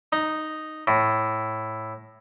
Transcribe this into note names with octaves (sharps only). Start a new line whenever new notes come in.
D#4
A2